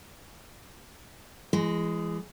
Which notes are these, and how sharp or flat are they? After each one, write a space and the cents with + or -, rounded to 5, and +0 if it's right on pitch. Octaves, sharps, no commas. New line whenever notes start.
E3 +35 G#3 +0